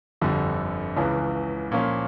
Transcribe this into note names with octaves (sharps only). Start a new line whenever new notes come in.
G1 F2 D3 G3
C#2 C#3 E3
A#2 F3 A#3 C#4